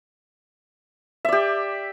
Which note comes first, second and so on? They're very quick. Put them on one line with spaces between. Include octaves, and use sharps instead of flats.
E5 D5 G4